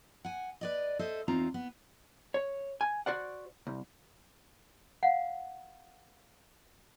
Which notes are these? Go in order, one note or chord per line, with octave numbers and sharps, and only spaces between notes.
F#5 G#5
B4 D5 D#5
A4 C5 D#5 E5
E2 C4 D#4 F4 A#5
B3
C#5
G#5
F#4 C5 D5 F#5
C2
F5 F#5